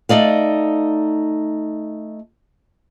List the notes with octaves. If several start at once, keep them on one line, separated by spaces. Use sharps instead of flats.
A3 D#4 D5 F5